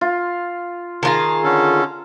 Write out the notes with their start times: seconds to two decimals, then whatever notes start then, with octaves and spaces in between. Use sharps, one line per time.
0.01 F4
1.03 D#3 F4 G#4 A5 A#5
1.43 D3 C#4 A4